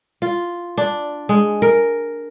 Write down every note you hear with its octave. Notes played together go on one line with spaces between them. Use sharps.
F4
D4
G#3
A#4